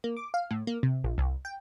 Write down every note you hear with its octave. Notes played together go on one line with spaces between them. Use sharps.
A#3
D6
F5
A2
A#3
C3
A#1
C2
G5